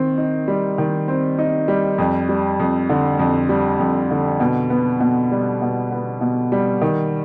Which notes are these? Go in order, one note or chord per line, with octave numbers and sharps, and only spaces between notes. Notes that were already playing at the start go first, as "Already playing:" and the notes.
Already playing: D#3 C4
D#4
G3
D#3
C4
D#4
G3
F2
G3
F2
D3
F2
G3
F2
D3
B2
B3
B2
G3
B2
B3
B2
G3
D#3